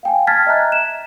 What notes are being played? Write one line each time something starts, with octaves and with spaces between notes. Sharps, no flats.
F5 G5 G#5
A5 F6 G#6 A6 B6
D#5 E5 A#5 F#6
E7